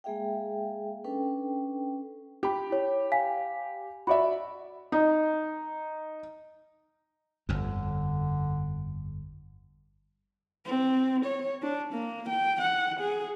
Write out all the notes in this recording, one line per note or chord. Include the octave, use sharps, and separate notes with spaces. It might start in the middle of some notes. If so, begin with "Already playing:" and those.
G#3 A#3 G#4 E5 F5 G5
C#4 D4 A4 B4 G5
G4 B5
E4 C#5
F5 G#5 B6
F#4 D5 E5 B5
D#4
G1 F2 D3
C4
C#5
D4
A#3
G5
F#5
G#4